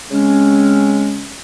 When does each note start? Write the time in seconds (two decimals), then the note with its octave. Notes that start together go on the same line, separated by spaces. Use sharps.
0.09 C#3 G#3 C4 C#4